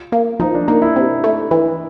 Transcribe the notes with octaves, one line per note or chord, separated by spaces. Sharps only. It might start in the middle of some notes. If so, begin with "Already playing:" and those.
Already playing: F4
A#3
F3 D#4
D4
A#3 D#4
E4
C3
A3
E3